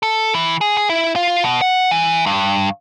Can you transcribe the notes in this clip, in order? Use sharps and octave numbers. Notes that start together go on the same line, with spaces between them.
A4
E3
G#4
G#4
E4
F4
B2
F#5
E3
G2